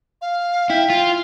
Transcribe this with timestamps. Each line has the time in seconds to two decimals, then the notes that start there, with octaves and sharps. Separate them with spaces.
0.22 F5
0.70 E4 G5
0.90 F4